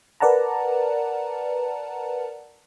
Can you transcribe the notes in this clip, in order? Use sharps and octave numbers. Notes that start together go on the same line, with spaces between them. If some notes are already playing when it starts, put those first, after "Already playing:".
A#4 B4 D5 F#5 A5 A#5